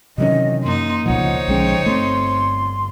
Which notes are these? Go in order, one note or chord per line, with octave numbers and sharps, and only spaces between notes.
C3 D#3 E3 F#3 C#4 D#5
F#2 A#3 D#4 C6
C#2 B2 D3 F3 D#4 C5 C#5 F#5
B1 D3 F3 G#3 C#4 G5
G1 A3 B3 C4 C6